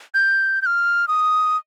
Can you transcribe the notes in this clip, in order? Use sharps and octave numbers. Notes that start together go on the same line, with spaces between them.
G6
G6
F6
D#6